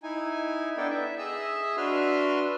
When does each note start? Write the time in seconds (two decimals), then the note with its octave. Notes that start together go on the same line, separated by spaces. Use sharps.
0.03 D#4 E4 G#5
0.78 B3 D4 E4 A4 D5 G5
0.90 E5
1.19 G#4 D#5 E5 E6
1.77 D4 F#4 B4 E5 C6 F6